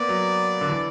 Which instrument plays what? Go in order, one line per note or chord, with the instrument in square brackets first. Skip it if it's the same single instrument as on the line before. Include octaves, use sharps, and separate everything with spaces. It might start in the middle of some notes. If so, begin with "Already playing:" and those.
Already playing: [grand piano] A#3 B3 [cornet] D5
[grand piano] F#3
D3
E3